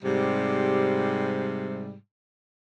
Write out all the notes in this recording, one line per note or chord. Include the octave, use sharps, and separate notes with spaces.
G#2 C3 G3